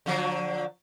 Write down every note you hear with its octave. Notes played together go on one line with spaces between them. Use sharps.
D3 F3 F#3